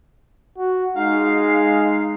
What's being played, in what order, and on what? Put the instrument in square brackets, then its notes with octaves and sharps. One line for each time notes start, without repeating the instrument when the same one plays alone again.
[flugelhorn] F#4
[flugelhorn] G#3 [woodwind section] D#4 F5